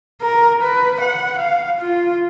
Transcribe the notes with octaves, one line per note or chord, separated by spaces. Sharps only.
A#4
B4
F#5
F5
F4